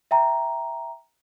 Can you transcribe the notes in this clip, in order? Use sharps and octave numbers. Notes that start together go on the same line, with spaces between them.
E5 G5 A#5